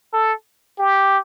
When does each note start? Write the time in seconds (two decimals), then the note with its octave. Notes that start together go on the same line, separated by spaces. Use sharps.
0.13 A4
0.79 G4